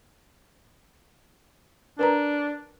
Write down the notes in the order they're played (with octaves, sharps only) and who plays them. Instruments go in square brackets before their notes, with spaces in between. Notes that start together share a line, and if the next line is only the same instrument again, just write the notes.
[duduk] D4 [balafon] A#4 B4 A#5